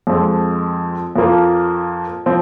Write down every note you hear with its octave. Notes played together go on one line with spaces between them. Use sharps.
F2 F3 G#3 C4
F2 F3 A#3 F4
F3 C4